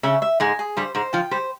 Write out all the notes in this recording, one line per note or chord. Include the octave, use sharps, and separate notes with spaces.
C#3 C#4 E5
E5
G#2 G#3 G#5
G#4
G2 G3 C5
G#2 G#3 C5
F3 F4 G5
G3 G4 C5